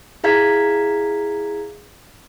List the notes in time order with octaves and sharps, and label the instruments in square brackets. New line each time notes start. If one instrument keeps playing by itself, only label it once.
[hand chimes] E4 G#4 F5 A#5 G#6 B6